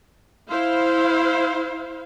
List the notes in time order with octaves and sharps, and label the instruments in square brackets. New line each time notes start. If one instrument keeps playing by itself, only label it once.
[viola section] E4 C5 F5